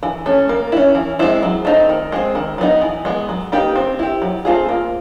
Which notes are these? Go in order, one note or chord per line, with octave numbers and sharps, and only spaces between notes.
E3
A3 C#4
A#3
C#4 E4
E3
G#3 C4 E4
F#3
A3 C4 D#4
D#3
G#3 C4
D#3
F#3 B3 D#4
E3
G#3 B3
F#3
A#3 D#4 G4 B4
C4
E4 G4
F#3
A3 C4 F4 G#4
A#3